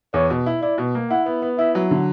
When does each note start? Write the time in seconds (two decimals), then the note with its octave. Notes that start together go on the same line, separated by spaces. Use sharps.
0.14 E2 C#5
0.30 B2
0.46 E4
0.62 E4 D5
0.78 B2
0.95 A#3
1.10 E4 F#5
1.26 B3
1.42 B3
1.58 E4 E5
1.75 F#3
1.91 D3